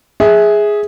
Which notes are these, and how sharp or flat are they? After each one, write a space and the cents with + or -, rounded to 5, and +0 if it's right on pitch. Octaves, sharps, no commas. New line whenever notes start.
G#4 +0 E5 -20